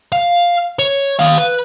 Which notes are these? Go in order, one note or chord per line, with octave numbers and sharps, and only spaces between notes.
F5
C#5
D#3 F5
B4